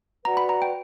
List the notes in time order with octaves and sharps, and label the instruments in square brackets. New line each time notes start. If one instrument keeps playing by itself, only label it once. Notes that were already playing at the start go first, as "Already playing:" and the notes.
[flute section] F#4 B4 D5 F#5 [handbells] A#5
[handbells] B5
A#5
G5